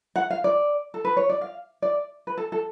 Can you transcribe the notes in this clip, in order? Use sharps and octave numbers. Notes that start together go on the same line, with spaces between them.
F#5
F5
D5
A4
B4
C#5
D5
F5
D5
B4
A4
A4